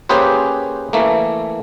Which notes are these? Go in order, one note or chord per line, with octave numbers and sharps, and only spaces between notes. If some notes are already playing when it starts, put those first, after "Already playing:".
A#3 C#4 G4 G#4 B4 C5
E3 A3 A#3